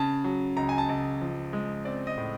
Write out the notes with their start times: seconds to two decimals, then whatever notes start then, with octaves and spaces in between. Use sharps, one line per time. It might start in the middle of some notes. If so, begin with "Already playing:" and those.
Already playing: C#3 A5
0.24 F#3
0.57 C#2 A#5
0.69 G#5
0.78 A5
0.89 C#2
1.21 F3
1.53 G#3
1.85 C4 D5
2.07 D#5
2.18 A2